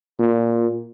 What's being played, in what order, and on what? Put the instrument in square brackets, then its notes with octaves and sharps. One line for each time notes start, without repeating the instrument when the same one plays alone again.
[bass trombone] A#2